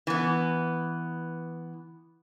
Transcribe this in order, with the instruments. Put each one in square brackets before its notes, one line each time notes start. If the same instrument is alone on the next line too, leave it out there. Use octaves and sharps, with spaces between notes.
[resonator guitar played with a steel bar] E3 B3